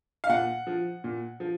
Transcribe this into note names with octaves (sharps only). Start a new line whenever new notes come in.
F5
A#2 F#5
F3
A#2
F3